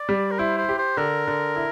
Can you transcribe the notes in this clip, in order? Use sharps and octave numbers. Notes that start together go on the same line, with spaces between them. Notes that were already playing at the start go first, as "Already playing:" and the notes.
Already playing: D5
G3
A#4
E4 C5
C5
G4
C5
D3 A#4
D3
E4